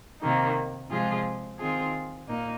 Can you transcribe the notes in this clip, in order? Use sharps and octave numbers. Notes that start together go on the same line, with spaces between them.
C3 D#3 A#3 D#4
C3 F3 G#3 F4 G#4
D#3 C4 F4 G#4
A#2 A#3 D#4